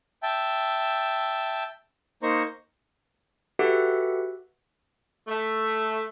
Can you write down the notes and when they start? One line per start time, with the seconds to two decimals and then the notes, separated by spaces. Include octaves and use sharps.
0.23 E5 G5 A5
2.23 A#3 D#4 C5 A#5 C#6
3.59 F#4 G4 A4 B4 E5 F#5
5.28 A3